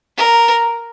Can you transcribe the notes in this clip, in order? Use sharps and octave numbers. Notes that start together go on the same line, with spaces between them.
A#4